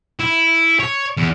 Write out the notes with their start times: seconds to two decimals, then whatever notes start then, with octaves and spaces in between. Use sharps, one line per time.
0.20 E4
0.80 C#5
1.17 E2